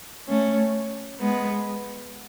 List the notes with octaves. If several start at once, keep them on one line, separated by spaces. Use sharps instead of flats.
A3 C#4
G#3 B3